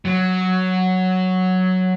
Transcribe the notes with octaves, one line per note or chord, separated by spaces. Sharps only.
F#3